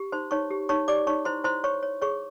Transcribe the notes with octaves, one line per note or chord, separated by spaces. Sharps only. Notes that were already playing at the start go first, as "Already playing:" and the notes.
Already playing: G4
D#4 C5 C6
D#4 C#5 C#6
G4
D#4 C#5 C#6
G4 D5 D6
D#4 C#5 C#6
E4 C5 C6
E4 C5 C6
C#5 C#6
C#5
G#4 C#5 C#6